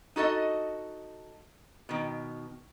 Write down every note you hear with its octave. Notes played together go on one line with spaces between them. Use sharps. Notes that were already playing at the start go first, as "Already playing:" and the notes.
D#4 F#4 A4 D#5
B2 D#3